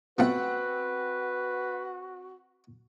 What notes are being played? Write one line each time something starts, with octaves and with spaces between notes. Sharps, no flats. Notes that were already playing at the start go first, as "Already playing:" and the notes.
B2 F3 A3 C4 F#4 B4 F#5